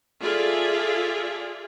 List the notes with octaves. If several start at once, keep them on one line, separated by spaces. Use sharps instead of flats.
F4 G#4 A4 D5 E5